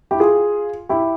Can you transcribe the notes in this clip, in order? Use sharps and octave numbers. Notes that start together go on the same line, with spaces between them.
E4 G4
F4 G#4
E4 G4